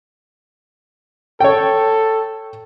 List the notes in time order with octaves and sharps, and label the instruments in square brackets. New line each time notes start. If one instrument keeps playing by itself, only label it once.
[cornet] A4 [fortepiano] C#5 G5